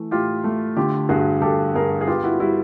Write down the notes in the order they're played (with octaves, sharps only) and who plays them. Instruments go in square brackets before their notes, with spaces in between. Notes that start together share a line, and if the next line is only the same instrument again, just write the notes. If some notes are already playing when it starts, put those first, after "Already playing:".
Already playing: [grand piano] E3 A3
[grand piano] A2 [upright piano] F4 G4
[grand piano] A3
[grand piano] D3 [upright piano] F4 G4
[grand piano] G2 [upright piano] F#4 G#4
[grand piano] G2 [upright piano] G4 A4
[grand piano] G2 [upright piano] G#4 A#4
[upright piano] G#4
[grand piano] B3 [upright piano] F4 G4
[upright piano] E4 F#4
[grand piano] G3 [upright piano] E4 F#4